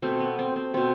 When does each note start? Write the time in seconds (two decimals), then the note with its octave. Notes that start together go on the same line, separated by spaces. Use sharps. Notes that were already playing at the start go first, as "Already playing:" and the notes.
0.02 B2 A3 C4
0.20 B3
0.39 C4
0.56 C4
0.74 B2 A3 C4